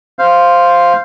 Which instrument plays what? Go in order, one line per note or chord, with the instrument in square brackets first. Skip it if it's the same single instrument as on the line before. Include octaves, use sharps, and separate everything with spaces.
[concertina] C5 F5